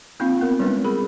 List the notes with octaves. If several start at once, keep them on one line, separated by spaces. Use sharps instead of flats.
A#3 C4 D#4 F4 F5
B3 A#4
G3 G#3 B3 C#4 B4
G#4 A#4 B5